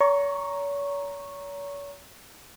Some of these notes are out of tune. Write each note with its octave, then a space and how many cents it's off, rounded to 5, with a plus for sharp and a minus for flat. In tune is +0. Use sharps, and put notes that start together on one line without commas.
C#5 +40 A#5 +0 C#6 -10